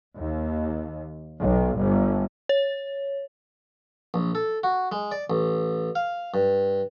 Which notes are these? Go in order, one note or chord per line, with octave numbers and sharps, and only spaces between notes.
D#2
B1
G1
C#5
A#1
A4
F#4
G#3
D5
A1
F5
G2